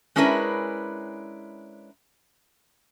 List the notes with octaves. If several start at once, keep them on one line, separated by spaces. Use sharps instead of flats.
G#3 C#4 D4 E4 A#4 B4